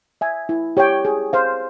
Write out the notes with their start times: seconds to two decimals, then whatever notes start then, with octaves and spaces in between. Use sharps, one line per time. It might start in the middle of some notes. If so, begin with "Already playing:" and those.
0.21 E5 G#5
0.49 E4
0.77 G4 C#5 G5
1.05 G#4
1.33 C5 F5